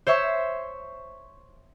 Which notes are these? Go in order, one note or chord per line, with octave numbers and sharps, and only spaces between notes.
C5 C#5 E5 C#6